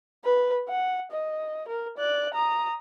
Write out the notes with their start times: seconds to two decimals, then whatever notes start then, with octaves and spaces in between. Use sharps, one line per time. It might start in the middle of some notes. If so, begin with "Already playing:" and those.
0.25 B4
0.68 F#5
1.11 D#5
1.68 A#4
1.98 D5 F#6
2.34 A#5 D#6